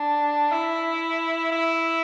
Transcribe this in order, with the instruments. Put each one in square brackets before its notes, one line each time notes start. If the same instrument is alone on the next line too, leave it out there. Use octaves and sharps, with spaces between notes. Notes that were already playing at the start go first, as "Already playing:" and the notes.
Already playing: [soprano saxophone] D4
E4
E4